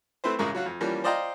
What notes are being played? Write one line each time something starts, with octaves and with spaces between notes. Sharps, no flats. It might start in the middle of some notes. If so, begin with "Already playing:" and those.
A3 C4 E4 B4 C5
A1 C#3 G#3 A#4 C#6
F#3 F4 F#4
F2
E3 F3 G3 A#3 C#4
C5 D5 D#5 F5 G5 A#5